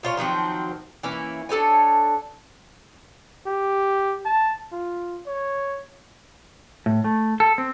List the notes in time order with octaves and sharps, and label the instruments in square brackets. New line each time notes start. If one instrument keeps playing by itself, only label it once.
[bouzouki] A#2 F4 C#5
D#3 F3 F#3 C4
E3 A#3 C#4 E4
D4 A4 C#5 G#5
[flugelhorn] G4
A5
F4
C#5
[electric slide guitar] A2
A3
A4
C4